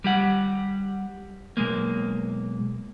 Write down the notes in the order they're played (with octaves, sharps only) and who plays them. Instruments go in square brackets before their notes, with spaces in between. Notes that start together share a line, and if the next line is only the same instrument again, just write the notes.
[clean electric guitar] G3 G4 F#5
B1 G#3 A#3